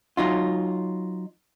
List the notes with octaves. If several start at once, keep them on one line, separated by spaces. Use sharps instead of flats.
F#3 D#4 F4